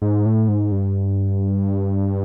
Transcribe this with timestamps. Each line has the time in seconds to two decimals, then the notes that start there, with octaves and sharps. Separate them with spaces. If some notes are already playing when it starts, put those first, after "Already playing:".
0.02 G#2
0.26 A2
0.49 G#2
0.72 G2